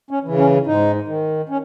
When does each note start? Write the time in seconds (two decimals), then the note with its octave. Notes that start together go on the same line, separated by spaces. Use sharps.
0.11 C#4
0.24 C#3 E3
0.38 C#4
0.67 G#2 D#4
1.08 D#3
1.49 C#4